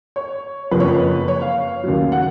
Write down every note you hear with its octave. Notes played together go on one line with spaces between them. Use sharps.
C#5
F#1 F2 F3 B4
C#5
B4
C#5
F5
D#2 C#3 F#3
F#5